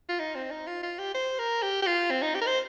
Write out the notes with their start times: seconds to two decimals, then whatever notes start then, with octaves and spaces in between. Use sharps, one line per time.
0.09 F4
0.19 D#4
0.35 C4
0.51 D#4
0.67 F4
0.83 F4
0.99 G4
1.14 C5
1.39 A#4
1.63 G4
1.82 G4
1.87 F4
2.11 C4
2.22 D#4
2.35 G4
2.42 A#4
2.46 C5